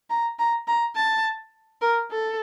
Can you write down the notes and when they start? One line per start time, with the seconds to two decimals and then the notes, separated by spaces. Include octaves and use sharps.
0.10 A#5
0.39 A#5
0.68 A#5
0.96 A5
1.81 A#4
2.11 A4